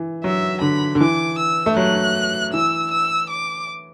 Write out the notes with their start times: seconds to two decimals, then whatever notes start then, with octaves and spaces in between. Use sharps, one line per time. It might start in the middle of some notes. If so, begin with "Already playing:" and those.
Already playing: E3
0.24 F#3 E5
0.61 D3 B5
0.95 D3
1.00 E3 D6
1.39 E6
1.66 A3
1.77 F#3 F#6
2.53 E3 E6
2.91 E6
3.30 D6